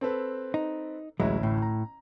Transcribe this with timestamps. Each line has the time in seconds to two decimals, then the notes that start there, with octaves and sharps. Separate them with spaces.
0.01 C4 A4 B4
0.54 D#4
1.20 A1 D2 F#3 G#3 E4
1.43 A2
1.62 A#5